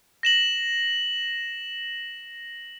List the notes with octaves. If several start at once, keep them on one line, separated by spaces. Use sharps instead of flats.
A#6 E7 F#7